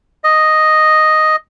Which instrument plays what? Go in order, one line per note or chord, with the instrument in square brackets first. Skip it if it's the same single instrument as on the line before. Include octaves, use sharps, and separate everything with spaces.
[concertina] D#5